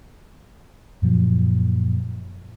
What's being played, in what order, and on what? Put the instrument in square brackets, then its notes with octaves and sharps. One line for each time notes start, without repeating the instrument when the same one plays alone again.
[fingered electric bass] F#2 A#2 F3 F#3